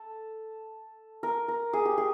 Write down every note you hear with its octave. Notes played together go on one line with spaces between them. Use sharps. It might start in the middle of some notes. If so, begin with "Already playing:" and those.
Already playing: A4
A#4
A#4
G#4
G4
G#4